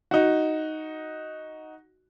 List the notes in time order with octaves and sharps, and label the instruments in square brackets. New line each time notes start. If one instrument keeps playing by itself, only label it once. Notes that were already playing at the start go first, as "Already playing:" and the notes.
[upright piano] D#4 F#4